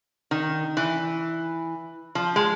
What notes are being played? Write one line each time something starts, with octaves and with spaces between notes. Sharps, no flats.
D#3
E3
F3
G#3